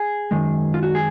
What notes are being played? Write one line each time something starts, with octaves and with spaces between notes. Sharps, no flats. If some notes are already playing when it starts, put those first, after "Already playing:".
Already playing: G#4
F#2 D#3 G#3
F4
F#4
G#4